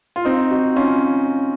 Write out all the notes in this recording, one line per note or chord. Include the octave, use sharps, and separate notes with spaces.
F4
C4 D#4
D#4 F#4
C#4 F4